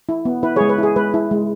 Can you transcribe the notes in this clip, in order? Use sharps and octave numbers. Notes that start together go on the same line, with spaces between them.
E4
B3
E4 B4
G#4 C#5
G#3
B4
E4
G#4
G#3 B4
E4
G#3